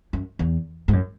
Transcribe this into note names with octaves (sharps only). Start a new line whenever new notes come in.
F#2
E2
G#2
F#2